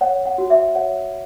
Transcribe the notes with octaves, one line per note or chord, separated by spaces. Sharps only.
C#5 F#5
F#5
F#4
E5
C#5 F#5